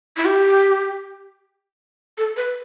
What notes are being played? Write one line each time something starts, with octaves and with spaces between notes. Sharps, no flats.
E4
G4
A4
B4